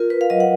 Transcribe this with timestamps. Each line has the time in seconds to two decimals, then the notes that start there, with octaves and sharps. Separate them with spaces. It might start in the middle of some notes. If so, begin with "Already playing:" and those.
Already playing: F4 A#4
0.10 B4
0.21 F5
0.30 F#3 D#5
0.40 F#5